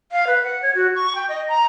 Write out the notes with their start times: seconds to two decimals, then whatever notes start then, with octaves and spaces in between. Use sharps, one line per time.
0.12 F5
0.27 B4
0.44 F#5
0.63 C#5
0.75 F#4
0.95 C#6
1.15 G5
1.29 D#5
1.49 A#5